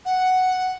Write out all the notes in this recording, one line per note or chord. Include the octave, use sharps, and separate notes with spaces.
F#5